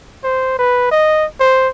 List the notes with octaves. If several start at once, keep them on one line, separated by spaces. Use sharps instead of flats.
C5
B4
D#5
C5